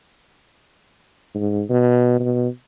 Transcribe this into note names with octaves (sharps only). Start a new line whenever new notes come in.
G#2
B2
B2